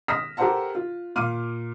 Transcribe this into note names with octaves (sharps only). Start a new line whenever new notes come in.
D#6 F6 A#6 B6 E7
G4 A4 A#4 C5 F#5 A5
F4
A#2 F5 D6 F6 D#7